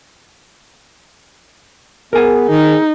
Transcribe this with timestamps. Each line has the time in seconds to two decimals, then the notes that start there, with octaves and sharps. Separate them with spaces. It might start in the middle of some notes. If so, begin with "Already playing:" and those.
2.13 B3 G#4 A#4 G#5
2.49 D#3 D#4